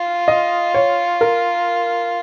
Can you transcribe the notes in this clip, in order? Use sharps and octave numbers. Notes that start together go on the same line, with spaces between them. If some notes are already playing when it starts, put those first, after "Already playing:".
Already playing: F4
D#5
C#5
A#4